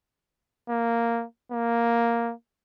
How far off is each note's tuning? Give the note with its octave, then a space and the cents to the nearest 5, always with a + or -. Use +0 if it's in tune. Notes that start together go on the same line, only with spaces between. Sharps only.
A#3 -5
A#3 +0